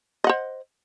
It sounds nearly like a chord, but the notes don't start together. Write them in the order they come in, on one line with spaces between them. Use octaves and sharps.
D#5 F#5 C5